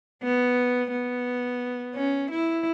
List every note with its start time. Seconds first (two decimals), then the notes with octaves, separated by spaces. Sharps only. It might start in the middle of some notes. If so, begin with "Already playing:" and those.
0.23 B3
0.91 B3
1.95 C#4
2.31 E4